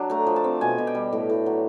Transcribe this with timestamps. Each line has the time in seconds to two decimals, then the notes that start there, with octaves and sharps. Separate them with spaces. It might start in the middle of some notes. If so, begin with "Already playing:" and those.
Already playing: F#3 D4
0.10 A3 A#5
0.27 F3
0.36 A5
0.44 C4
0.61 B2 G#5
0.78 B2
0.87 G5
0.95 G3
1.13 A2
1.29 A2
1.46 F#3